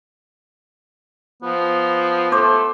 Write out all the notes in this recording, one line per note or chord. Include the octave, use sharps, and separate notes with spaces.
F3 B3
A3 C5 D6